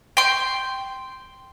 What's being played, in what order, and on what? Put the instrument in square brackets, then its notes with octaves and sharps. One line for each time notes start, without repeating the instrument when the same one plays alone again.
[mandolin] G5 C6